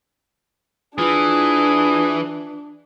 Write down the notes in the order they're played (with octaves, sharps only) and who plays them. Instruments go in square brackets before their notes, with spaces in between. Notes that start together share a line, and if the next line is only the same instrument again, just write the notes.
[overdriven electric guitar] E3 [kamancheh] D4 [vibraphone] F4 [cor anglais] G#4